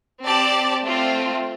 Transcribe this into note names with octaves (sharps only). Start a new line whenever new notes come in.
C4 G4 D5 A5
A3 C4 F4